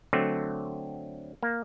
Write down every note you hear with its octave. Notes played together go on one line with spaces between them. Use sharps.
D3 F#3 A3 C4
A#3